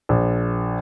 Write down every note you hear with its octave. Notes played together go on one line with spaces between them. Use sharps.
A#1